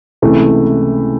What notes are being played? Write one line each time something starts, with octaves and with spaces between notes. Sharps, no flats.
C#2 C3 E3 A3